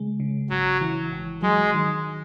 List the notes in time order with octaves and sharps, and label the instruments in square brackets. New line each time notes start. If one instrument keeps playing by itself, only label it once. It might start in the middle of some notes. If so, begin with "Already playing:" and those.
Already playing: [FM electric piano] C#3 G#3
C#3
[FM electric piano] G#1 [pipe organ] F#3
[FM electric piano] E3
G#1
[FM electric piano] F#3 [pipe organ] G#3
[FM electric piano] D#3